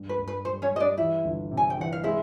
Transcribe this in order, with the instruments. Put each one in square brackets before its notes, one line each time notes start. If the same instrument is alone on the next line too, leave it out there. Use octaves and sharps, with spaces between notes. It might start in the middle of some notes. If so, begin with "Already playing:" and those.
Already playing: [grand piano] G2
[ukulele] B4
[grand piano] G2
[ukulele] B4
[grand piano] G3 [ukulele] C5
[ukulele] C#4 C#5
[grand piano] G3 [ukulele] D#5
[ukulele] D4 D5
[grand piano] E3 [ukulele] E4 E5
[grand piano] G1
C3
[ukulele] G#5
G5
[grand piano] E3 [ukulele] F#5
[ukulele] F5
[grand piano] G#3 [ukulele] E4 E5